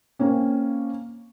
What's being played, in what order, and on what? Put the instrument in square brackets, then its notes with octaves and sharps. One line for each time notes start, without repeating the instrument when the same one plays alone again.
[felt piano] A#3 C4 C#4